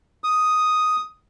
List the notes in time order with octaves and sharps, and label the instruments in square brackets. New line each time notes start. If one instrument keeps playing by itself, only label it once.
[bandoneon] D#6